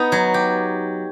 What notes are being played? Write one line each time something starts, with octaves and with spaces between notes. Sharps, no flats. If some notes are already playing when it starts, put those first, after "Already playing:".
Already playing: B3 D#4
F#3
G4